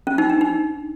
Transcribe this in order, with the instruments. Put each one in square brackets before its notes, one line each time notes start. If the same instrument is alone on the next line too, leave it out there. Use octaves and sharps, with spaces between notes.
[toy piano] C#4
D#4
D4
D#4